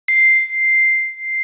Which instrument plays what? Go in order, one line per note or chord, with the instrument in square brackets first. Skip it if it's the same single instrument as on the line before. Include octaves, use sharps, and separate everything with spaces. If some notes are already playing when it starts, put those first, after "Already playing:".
[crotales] C7